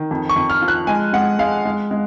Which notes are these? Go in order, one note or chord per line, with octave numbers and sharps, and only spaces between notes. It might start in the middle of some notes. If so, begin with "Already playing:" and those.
Already playing: D#3
F2
C#6
F2
F6
F3
F#6
G#3 G#5
G#3 F#5
G#3 F5
G#3
G#3